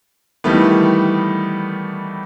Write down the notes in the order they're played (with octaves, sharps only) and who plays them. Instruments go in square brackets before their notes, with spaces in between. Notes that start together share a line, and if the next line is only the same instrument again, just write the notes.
[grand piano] D#3 E3 G3 A3 B3